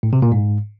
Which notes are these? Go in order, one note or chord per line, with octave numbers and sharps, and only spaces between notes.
A2
C3
A#2
G#2